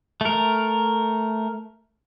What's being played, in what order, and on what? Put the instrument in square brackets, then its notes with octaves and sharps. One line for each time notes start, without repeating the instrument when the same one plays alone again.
[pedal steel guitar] A3 A#4